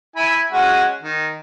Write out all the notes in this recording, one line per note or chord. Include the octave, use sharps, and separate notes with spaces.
E4 G#5 B5
G#3 C#4 F#4
D#3